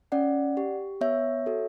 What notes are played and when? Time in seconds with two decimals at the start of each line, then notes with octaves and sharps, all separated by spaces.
0.12 C#4 D5 F#5
0.57 G4
1.01 B3 C#5 E5
1.46 F#4 A4